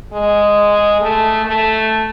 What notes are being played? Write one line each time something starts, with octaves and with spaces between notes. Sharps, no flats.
G#3
A3
A3